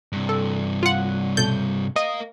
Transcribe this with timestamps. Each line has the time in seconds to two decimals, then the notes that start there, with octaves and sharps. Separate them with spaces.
0.12 G2 C3
0.29 A4
0.83 F4 F#5
1.37 B1 A4 G6
1.96 A#4 D#5 F5